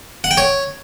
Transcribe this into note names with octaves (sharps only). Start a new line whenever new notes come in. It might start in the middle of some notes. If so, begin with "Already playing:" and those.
F#5
G5
C#5